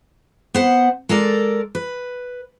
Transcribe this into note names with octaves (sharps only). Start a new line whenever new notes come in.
B3 C5 F#5
G#3 A4 A#4 D5
B4